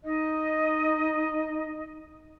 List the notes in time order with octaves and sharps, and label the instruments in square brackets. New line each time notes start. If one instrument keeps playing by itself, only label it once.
[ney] D#4 [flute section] D#5